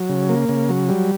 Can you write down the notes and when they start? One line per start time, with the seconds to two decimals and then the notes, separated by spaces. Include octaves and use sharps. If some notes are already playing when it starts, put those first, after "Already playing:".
Already playing: F#3
0.09 C#3
0.29 A#3
0.49 C#3
0.69 F#3
0.89 G3